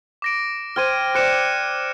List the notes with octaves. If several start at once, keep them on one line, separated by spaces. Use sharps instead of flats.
D6 A#6 D7
C5 G5 F6 G#6 D#7
C5 D5 F#6 C#7 E7